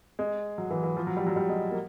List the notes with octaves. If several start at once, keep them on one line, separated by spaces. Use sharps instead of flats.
G#3
F#3
E3
E3
F3
F#3
G3
F#3
G3
G#3
A#3